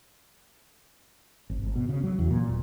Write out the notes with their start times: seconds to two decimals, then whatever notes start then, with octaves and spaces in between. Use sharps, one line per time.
1.50 G#1
1.62 G#1
1.76 B2
1.89 C#3
2.03 F#3
2.19 E2
2.31 A#2
2.49 D#1